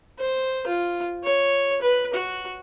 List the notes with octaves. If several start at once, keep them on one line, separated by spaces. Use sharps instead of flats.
C5
F4
C#5
B4
F#4